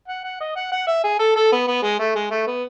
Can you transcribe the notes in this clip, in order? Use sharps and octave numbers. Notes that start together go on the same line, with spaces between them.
F#5
F#5
D#5
F#5
F#5
E5
G#4
A4
A4
B3
B3
G#3
A3
G#3
A3
B3